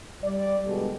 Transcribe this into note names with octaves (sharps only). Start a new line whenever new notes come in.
G3 D5
G1 B2 G#3 G4 A4